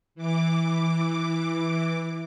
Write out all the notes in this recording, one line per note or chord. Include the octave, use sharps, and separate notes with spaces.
E3 D6